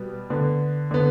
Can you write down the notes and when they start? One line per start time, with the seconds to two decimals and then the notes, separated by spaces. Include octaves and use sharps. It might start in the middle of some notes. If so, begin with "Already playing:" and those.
Already playing: B2 G3 B3
0.30 D3 B3
0.91 D3 B3